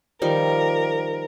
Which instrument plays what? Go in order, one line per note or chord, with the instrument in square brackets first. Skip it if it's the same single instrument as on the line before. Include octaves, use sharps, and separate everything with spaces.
[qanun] D#3 F3 G3 [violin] A#4